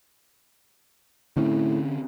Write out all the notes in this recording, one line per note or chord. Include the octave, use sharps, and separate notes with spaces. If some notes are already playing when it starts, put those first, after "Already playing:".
A2 D3 C4 C#4